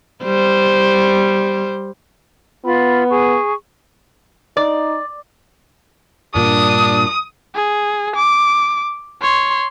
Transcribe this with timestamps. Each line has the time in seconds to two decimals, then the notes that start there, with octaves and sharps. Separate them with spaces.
0.24 G3 C5
2.65 B3 F4 B5 F6
3.11 G#4 C#6
4.57 D#4 D5
6.35 G2 A#2 D4 D#6
7.55 G#4
8.16 D6
9.22 C#5 C6